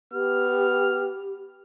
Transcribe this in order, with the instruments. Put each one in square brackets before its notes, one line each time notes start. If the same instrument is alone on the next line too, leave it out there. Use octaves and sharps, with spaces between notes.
[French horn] B3 [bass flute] G4 [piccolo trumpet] F6